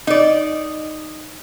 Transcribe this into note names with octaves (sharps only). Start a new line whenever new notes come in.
D#4 D5